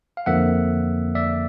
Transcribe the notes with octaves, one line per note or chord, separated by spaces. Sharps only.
F5
F2 D3 F3 A#3 E5 F#5
D5 E5